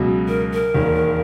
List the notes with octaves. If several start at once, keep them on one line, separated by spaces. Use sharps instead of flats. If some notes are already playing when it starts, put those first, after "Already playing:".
Already playing: C#2 B2 F#3
A#4
A#4
E1 D#2 D#3